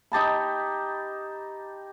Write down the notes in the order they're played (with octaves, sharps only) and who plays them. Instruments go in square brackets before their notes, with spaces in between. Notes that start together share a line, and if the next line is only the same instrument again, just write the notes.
[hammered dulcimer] D#4 G4 A5 B5